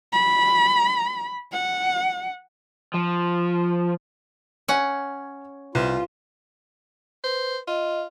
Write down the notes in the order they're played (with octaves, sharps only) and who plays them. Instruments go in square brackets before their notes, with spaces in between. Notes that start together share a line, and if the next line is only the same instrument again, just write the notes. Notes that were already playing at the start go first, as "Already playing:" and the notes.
[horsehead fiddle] B5
F#5
[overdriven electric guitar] F3
[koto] C#4 F#5 [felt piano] C#5 G#5 G#6
[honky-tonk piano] C2 [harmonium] F4 [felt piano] G4 B4
[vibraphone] B4 [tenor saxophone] C5
[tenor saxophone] F4 [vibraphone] D#5